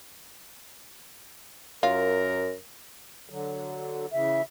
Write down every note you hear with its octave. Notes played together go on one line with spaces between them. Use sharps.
F#2 F4 A#4
D3 F#3
C#3 E3 E5